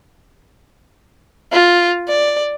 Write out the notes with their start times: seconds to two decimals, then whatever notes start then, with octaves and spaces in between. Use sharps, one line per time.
1.52 F4
2.08 D5